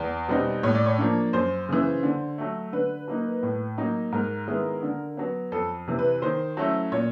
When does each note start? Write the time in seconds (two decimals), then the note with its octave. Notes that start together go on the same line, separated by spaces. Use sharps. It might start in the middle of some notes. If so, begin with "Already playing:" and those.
Already playing: E2
0.28 B2 G3 C4 D#4
0.63 A2 C#5
0.75 D5
0.86 C#5
0.98 F3 A#3 D4
1.33 F#2 C5
1.69 C#3 E3
2.03 D3
2.38 F#3 A3
2.73 D3 B4
3.08 F#3 A#3 D#4
3.43 A2
3.78 F#3 A#3 D#4
4.12 G#2 A#4
4.47 D#3 G#3 B3 E4
4.83 D3
5.17 F#3 B3
5.52 F2 A4
5.87 C3 E3
5.99 B4
6.22 D#3 C5
6.57 F#3 A3 C#4 E4
6.92 A#2 C#5